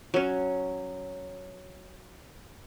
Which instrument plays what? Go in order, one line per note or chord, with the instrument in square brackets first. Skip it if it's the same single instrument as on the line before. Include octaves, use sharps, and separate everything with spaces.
[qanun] F#3 C#4